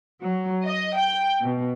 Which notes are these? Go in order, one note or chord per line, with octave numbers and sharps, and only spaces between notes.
F#3
D#5
G5
B2